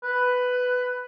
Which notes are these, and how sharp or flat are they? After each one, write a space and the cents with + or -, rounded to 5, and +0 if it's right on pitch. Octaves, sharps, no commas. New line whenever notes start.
B4 +10